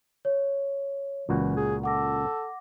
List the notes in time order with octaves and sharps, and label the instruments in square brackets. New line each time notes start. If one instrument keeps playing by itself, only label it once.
[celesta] C#5
[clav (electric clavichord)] C#2 A#2 F#4 [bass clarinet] E3
[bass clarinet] G#4
[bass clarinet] A4 [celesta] F#5 D6 A#6